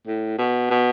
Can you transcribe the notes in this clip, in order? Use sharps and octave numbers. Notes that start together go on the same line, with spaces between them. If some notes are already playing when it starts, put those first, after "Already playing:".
A2
B2
B2